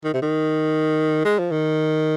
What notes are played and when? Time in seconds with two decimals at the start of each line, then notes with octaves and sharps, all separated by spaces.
0.04 D#3
0.14 C3
0.22 D#3
1.25 G#3
1.39 F3
1.52 D#3